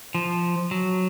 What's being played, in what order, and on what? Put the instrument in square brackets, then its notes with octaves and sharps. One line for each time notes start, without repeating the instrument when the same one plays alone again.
[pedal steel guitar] F3
F#3